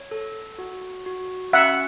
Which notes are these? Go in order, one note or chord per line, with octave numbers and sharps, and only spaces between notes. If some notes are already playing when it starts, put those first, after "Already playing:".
Already playing: C#5
A4
F#4
F#4
C#4 E5 F#5